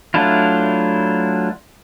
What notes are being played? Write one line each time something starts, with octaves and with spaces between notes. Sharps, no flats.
F#3 A3 D4 E4 F4